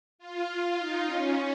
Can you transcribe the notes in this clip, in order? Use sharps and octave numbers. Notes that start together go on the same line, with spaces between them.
F4
F4
D#4
C#4